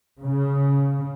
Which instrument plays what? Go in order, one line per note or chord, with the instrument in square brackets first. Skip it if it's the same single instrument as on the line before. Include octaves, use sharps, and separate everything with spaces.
[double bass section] C#3